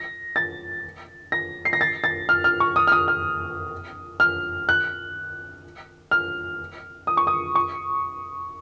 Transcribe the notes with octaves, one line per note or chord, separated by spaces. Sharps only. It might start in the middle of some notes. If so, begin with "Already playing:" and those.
Already playing: A#6
A6
A#6
C7
A#6
A6
A6
F6
F6
C#6
D#6
F6
D#6
F6
F6
F#6
F6
D#6
C#6
D#6
C#6